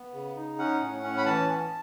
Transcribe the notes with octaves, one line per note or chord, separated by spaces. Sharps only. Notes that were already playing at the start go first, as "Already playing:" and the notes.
Already playing: B3
C#3
D#4
C#4 F#5
A2
C#4
B5
E3 A5
B3